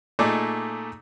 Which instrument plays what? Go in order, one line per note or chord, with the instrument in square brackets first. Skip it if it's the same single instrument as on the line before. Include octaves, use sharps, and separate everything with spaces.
[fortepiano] A#2 A3 D#4 G#4 D5 D6